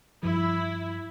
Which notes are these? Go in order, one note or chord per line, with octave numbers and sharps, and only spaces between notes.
G2 F3 E4